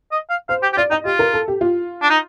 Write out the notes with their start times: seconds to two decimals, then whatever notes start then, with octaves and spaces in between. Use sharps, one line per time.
0.12 D#5
0.30 F5
0.49 C5 F5
0.62 G4
0.73 G4
0.77 F4 D5
0.90 D#4 D#5
1.05 F4 G4
1.19 A#4
1.33 A4
1.48 G4
1.61 F4
2.02 D4
2.10 D#4